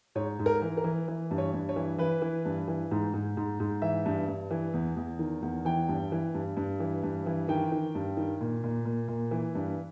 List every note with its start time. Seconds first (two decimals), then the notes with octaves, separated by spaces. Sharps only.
0.15 G#2 C#5
0.39 G#2
0.46 A#4
0.62 E3
0.77 A#4
0.84 E3
1.08 E3
1.31 G2
1.38 C#5
1.54 G2
1.69 C#5
1.76 E3
1.98 E3 B4
2.22 E3
2.45 G2
2.68 E3
2.91 G#2
3.14 G#2
3.37 G#2
3.60 G#2
3.82 E3 E5
4.06 G2
4.28 G2
4.51 E3
4.74 E2
4.96 E2
5.19 D#3
5.42 E2
5.65 E3 G5
5.89 G2
6.12 E3
6.34 G2
6.57 G2
6.80 E3
7.03 G2
7.26 E3
7.48 D#3 G5
7.72 D#3
7.95 G2
8.17 D#3
8.41 A#2
8.64 A#2
8.85 A#2
9.08 A#2
9.31 E3
9.55 G2